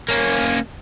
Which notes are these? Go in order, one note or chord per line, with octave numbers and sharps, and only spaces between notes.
A#3 C#4